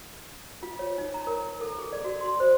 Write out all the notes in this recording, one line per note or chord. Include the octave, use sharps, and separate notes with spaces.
F4
C#5
D#4
A#5
A#4
A4
G#4
D5
F#4
C6
C5